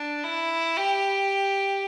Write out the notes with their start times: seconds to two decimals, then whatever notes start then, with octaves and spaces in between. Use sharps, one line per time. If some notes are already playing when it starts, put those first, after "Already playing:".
Already playing: D4
0.24 E4
0.77 G4